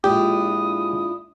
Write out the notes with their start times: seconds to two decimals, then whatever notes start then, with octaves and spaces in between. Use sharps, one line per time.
0.04 A#1 A#2 G#3 D4 E4 F4 G4 D#6